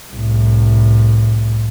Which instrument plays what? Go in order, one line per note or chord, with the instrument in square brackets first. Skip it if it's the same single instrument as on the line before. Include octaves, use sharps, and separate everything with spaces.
[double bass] C2 A2